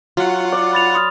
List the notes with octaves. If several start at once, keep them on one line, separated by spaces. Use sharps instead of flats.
F#3 F4 F#5
D5
B5 A6 F7
C6 D#6 F6